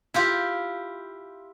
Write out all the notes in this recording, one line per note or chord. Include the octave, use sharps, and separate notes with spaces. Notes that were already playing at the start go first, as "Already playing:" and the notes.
E4 F4 G4